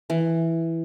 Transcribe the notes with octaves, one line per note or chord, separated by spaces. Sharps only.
E3